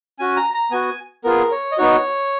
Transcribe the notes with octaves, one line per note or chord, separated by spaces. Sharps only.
C#4 F#4 G#5
A#5
A#5
B3 F#4 G#5
B3 F4 G#4 A#4
C#5
D#5
B3 D#4 F#4 C#5